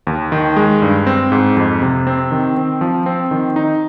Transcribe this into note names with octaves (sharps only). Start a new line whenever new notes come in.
D#2
D#3
G#3
G2
C4
G#2
F2
C3
C4
D#3
C4
F3
C4
D#3
D#4